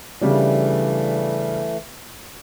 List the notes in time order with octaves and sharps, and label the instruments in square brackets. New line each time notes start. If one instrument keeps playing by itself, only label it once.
[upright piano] C#3 G3 D4 [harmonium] E3 A3